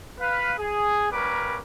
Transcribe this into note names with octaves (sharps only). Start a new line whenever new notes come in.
B4 F5
G#4
G3 A#3 C#4 A#4 B4 D6